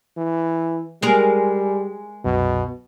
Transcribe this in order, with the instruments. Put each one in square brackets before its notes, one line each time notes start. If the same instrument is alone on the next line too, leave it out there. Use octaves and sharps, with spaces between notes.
[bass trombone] E3
[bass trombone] G3 [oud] G#3 G#4 A#4
[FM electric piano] C2 F#2 [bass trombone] B2